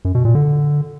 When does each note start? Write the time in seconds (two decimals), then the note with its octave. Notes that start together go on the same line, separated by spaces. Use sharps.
0.05 F#2
0.15 B2
0.25 A#2
0.35 D3